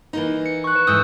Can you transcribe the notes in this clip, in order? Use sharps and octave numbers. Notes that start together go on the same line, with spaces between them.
E3 A#3 D#4
C#7
C#6 F#6
B4
F2 G#2 E3 D#6 E6 G6